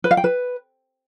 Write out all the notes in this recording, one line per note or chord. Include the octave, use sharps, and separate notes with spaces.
B4
F5
G5
B4